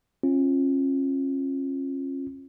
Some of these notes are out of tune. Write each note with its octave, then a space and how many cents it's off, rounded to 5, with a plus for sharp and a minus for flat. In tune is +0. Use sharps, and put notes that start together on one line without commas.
C#4 -35 F4 -5